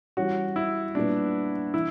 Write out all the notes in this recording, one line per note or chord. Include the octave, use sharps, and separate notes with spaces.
E3 G3 C#4 F#4
E4
A#2 G3 B3 D4
E3 E4